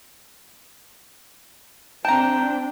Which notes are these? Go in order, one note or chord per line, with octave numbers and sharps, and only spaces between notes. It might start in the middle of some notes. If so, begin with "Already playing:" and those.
C4 D4 G5 A5 A#5